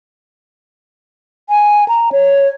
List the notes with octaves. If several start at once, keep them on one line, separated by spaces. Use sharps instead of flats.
G#5
A#5
C#5